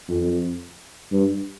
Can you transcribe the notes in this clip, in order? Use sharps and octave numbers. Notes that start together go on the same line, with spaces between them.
F2
G2